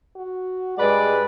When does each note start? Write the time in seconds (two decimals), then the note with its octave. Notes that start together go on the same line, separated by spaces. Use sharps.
0.16 F#4
0.78 G2 G#3 B4 D5